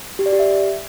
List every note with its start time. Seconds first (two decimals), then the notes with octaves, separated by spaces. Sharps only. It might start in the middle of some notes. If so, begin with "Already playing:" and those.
0.19 G4
0.26 D5
0.33 G4
0.39 E5